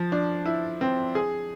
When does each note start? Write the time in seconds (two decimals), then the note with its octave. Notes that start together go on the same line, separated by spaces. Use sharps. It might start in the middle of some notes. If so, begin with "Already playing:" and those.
Already playing: F3
0.12 D4
0.46 E4
0.81 C4
1.15 G#4